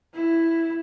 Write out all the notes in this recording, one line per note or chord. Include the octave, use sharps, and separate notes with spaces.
E4